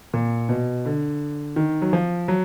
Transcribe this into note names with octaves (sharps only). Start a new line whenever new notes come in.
A#2
B2
D3
D#3
F#3
F3
F#3